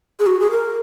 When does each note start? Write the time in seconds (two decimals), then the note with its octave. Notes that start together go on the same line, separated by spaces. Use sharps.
0.20 G#4
0.26 F#4
0.40 G#4
0.51 A#4